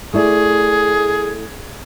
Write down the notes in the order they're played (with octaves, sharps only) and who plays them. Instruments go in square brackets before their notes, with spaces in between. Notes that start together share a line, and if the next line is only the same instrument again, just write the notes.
[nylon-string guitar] A3 E4 D5 [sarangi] G#4